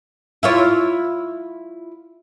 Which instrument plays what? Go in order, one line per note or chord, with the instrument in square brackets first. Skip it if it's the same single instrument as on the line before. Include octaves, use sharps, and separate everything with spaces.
[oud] E4 F4 C#5